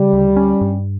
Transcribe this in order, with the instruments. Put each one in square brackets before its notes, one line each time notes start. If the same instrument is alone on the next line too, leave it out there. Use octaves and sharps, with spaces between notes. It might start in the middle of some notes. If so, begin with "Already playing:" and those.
Already playing: [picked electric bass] C#3 [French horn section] G3
[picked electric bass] D2
C#4
G2